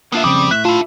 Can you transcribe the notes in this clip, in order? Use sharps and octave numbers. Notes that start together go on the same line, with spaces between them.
A#3 B3 D4 F4 E5
F2 C#3 G3 C4 D6 D#6
A2 E5 F#6
D4 E4 F4